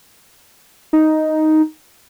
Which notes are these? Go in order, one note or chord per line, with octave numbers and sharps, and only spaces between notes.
D#4